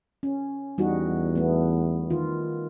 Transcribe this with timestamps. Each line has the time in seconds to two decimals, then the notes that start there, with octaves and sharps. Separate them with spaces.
0.23 C#4
0.78 E2 G3 D#4 F#4
1.35 A3 B3
2.10 D#3 F4